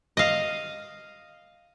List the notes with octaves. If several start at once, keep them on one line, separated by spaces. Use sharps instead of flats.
D#5 F5